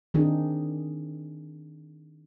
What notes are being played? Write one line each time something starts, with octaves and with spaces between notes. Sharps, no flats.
D#3 C4 D4 D#4 G#4